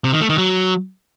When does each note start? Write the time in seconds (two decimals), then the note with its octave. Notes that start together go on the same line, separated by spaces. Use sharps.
0.04 C3
0.12 D#3
0.21 A3
0.29 D#3
0.38 F#3